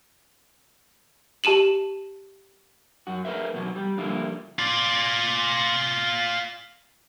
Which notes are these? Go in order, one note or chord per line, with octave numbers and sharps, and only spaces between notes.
G4 A5 D#7 E7 F#7
F#2 F#4
G#4 A#4 B4 E5
E2 B2 F#3
G3
D3 F3 G3 A#3 E4
F4 D5